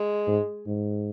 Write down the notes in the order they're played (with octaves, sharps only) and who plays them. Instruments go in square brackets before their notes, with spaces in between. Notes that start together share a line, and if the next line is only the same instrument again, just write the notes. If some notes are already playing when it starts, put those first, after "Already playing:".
Already playing: [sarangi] G#3
[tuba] G#2
G#2